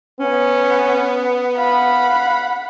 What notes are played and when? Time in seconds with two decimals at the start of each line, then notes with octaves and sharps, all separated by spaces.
0.20 B3 C#4
1.58 F5 F#5 B5